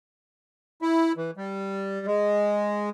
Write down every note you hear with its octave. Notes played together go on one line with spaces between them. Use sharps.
E4
E3
G3
G#3